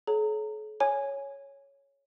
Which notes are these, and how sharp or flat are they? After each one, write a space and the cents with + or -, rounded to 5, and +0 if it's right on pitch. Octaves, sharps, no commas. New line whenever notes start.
A4 -45 C#5 +0 A#5 -25
C#5 +0 G#5 +0